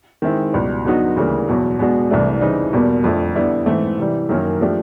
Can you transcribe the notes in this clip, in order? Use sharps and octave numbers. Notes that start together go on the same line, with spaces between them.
D#3 G#3 C4 E4
C#2 B2 G3
D3 F#3 B3 D#4 F#4
D2 C#3 E3 G3 A#3
E2 B2 F#3
B2 G#3 B3 D4 F#4
C2 C3 E3 A3 D4
C#3 E3 G3 C4 D#4
E2 B2 G3 A#3
F2 D3 F3 A3
D3 G3 B3 E4
G#2 E3 A3 C4
C3 E3 G3
F#2 D#3 F#3 A#3 C#4
F3 A3 D4 G4